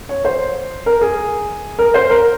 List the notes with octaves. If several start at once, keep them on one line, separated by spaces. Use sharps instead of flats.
C#5
C5
A#4
G#4
A#4
C5
A#4